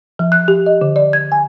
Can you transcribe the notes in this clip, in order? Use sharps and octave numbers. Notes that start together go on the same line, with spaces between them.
F3
F#6
G4
D#5
D3
D5
G#6
G#5